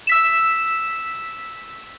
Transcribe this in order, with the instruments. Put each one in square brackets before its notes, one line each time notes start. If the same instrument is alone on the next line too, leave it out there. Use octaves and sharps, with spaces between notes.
[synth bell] E6 B6 E7